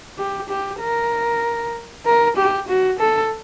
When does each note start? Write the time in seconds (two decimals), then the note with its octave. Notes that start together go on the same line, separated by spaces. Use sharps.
0.18 G4
0.49 G4
0.80 A#4
2.06 A#4
2.37 G4
2.68 F#4
2.99 A4